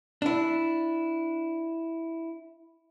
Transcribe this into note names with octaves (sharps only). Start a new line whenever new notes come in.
D4 E4